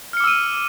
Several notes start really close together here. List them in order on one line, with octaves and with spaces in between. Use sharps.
F6 C#7 D6 E6 D#7